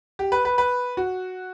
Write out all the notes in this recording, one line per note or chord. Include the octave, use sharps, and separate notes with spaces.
G4
B4
B4
B4
F#4